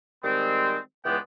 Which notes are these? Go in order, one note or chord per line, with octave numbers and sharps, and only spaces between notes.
D#3 G3 G#3 C4
C#2 E3 G#3 B3 D5 G5